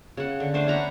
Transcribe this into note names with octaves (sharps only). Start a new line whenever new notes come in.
C#3 F#5
D3
A3 D4 C5
C#4 F#5 A#5 B5